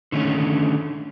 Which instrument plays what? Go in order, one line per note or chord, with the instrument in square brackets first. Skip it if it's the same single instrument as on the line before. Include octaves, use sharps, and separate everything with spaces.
[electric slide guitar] D3 D#3 A3 C#4